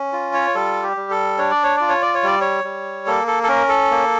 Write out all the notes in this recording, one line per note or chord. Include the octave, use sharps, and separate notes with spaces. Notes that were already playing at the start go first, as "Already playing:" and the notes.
Already playing: C#4
F4
C#5
G3 A4
G4
G3
A4
D4 C#5
D5
C#5
F4 D5
C#5
D5
C#5
G3 D5
C#5
G3
A#3 A4
A4
A4
C#4 A#4
A4
A#3